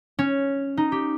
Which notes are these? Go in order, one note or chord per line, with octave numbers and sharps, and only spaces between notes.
C#4
D#4
G4